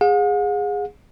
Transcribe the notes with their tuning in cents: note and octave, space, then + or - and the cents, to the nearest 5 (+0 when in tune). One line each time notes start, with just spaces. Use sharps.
G#4 -15 F#5 -45